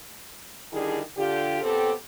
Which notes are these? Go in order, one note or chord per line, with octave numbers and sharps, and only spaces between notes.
D3 D#3 G3 D4 E4 G#4
D3 F4 G4
A#2 B3 C4 G4 A4